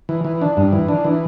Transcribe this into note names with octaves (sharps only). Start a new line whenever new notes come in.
E3
E3
D4
G2
E3
D4
E3